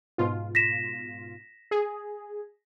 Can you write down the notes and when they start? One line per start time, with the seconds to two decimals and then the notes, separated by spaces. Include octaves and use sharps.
0.18 G#2 B2 F4
0.55 A#6 B6 E7
1.71 G#4